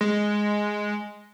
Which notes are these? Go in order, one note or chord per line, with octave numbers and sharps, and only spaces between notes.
G#3